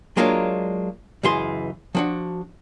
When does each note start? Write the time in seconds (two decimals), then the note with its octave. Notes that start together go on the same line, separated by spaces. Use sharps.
0.17 F#3 G#3 A#3 D4 F4 C#5
1.23 C#2 F#2 E3 G#4 C6
1.95 F3 D4 F#4